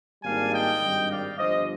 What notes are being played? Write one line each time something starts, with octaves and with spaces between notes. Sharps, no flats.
G#1 G#2 G3 A#3 D4 F5 G#5
D#5 G5
G#1 G2 D#3 G3
D5 F5
G1 G2 F3 C5 D#5